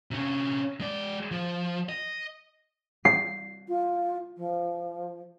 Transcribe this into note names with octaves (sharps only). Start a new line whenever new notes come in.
C3 C#4
G#3 D5
F3
D#5
C7
F4
F3